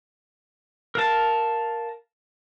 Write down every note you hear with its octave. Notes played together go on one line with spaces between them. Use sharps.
A#4 F5 A5